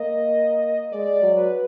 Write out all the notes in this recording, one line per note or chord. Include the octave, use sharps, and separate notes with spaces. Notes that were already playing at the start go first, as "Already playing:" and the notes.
Already playing: A#3 D#5
G#3 D5
F#3
B4